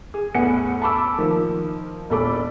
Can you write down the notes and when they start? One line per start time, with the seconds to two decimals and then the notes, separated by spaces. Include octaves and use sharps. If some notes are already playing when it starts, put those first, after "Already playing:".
0.14 G#4
0.35 E2 A2 B3 F#5 G#5 C#7
0.82 A5 B5 D6 E6
1.18 D#3 F3 A#3
2.10 E1 A#2 A4 B5 D6